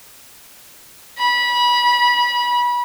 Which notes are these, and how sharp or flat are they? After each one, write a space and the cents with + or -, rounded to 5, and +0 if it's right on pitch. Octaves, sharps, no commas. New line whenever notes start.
B5 -25